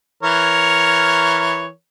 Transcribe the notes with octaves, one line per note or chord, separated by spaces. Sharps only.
E3 A#4 C#5